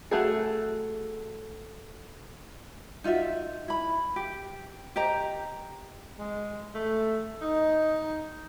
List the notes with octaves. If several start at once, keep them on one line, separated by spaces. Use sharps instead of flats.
A3 F#4 G#4
D#4 F4 F#4 E5
E4 B5
G4
G4 C5 D#5 A#5
G#3
A3
D#4